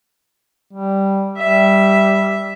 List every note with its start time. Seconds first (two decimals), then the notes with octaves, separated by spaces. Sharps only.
0.73 G3
1.37 G3 E5